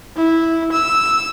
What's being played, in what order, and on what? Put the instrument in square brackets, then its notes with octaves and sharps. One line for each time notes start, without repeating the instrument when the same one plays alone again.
[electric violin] E4
E6